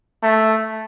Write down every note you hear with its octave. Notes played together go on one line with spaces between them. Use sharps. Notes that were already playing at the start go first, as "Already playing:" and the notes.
A3